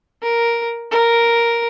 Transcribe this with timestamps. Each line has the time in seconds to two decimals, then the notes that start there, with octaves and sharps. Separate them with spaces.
0.22 A#4
0.91 A#4